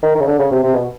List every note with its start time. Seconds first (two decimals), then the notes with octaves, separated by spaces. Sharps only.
0.03 D#3
0.15 D#3
0.21 C#3
0.27 D3
0.39 C#3
0.52 C3
0.64 C3
0.75 B2